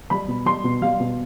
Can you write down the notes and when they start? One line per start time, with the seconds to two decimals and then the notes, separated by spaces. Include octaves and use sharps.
0.10 G3 B5
0.28 B2
0.46 G3 C6
0.64 B2
0.82 G3 F5
1.00 B2